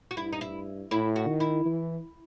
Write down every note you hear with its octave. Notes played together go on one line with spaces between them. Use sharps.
F#4
G2 E4
D#4
E4
A2 E4
F#4
D#3
E4
E3